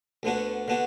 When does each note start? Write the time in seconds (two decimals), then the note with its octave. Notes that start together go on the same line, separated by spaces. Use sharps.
0.23 D2 D3 B3 D4 F#4
0.68 D3 B3 D4 F#4